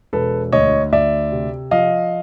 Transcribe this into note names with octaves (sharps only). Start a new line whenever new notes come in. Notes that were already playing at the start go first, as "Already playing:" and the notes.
E1 A4 B4
D2 C#5 D#5
D2 D5 E5
C3
F3 D#5 F5